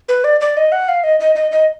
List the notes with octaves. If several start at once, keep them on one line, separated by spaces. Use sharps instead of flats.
B4
D5
D5
D#5
F#5
F5
D#5
D#5
D#5
D#5